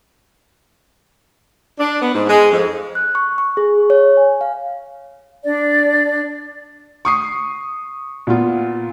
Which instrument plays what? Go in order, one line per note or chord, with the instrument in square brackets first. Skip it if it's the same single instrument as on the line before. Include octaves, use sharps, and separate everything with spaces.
[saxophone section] D4
B3
G#2
G#3
F2
[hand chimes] F#6
C#6
C#6
G#4
C#5
G#5
F5
[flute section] D4 D5
[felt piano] C#6 D#6 C7
A#2 B3 F4